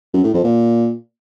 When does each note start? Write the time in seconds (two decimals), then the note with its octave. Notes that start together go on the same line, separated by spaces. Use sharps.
0.14 F#2
0.24 A2
0.34 F2
0.44 A#2